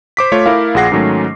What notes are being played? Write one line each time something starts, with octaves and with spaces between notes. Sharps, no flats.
C5 D6 B6
A3 F4 C#5
A3 E4 A4 A#4 F5
A#1 F4 G#4 F#5 A#6 C7
G#2 D#3 F#3 A3 C#4